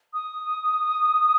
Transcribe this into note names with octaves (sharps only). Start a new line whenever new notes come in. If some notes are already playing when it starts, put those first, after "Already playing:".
D#6